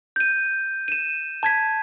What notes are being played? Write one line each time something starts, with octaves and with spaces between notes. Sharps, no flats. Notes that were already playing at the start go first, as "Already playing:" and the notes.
G6 D#7
D#7 E7
A5 G#6 B6